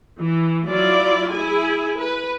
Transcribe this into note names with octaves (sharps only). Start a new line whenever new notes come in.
E3
F#3 E4 F4 D5
E4 G#4 G#5
B4